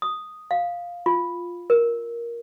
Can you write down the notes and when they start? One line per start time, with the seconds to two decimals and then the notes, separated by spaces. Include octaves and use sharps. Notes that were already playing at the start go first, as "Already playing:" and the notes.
0.02 D#6
0.51 F5
1.06 F4
1.70 A#4